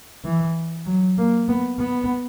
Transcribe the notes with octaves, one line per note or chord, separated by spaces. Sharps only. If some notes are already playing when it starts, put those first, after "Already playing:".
E3
F#3
A#3
B3
B3